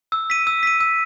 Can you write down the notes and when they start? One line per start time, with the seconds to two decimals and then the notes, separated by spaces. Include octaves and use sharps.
0.12 E6
0.30 B6 D#7
0.47 E6
0.63 B6 D#7
0.80 E6